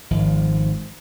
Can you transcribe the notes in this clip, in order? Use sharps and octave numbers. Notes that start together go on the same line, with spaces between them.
G#1 F3